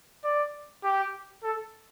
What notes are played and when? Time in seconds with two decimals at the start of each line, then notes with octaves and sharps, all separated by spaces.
0.24 D5
0.84 G4
1.43 A4